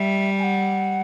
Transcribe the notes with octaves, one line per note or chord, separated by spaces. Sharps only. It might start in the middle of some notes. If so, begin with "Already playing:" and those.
Already playing: G3 E5
G#5
F#5